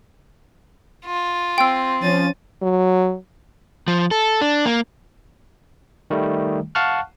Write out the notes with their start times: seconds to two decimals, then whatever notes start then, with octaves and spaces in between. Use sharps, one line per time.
1.06 F4
1.58 C4 G5 E6
2.02 F3 C#4 A6 D#7
2.62 F#3
3.88 F3
4.11 A4
4.41 D4
4.66 A#3
6.10 D#3 G3 A3
6.75 F5 F#5 A5 C#6 F6 F#6